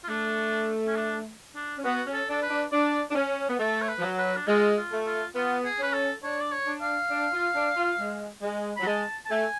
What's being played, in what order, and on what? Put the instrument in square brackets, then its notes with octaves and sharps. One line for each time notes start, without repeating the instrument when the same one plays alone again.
[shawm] F4
[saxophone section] A3 [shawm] D4
[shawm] C#4
D4
D4
[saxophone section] C#4
[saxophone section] B3 [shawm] F#4
[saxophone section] C#4
[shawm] A4
[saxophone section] D4 [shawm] A4
[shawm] B4
[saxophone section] D4
[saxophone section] D4 [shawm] D5
[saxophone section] D4
C#4
B3
[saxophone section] A3 [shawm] A4
[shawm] C#5
B4
[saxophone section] F3
F#3
[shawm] B4
D4
[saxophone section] G#3 [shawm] F4
[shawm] F4
[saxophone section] A3
[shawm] F4
[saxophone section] B3 [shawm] F4
[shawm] G#4
[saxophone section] C#4 [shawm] B4
[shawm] A4
[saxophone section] D4 [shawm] C#5
[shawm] D5
C#5
[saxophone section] D4
[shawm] F5
[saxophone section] D4
F4
D4
F4
G#3
G#3
[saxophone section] F#3 [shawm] B5
[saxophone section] G#3 [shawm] A5
[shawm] A5
[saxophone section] A3 [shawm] G#5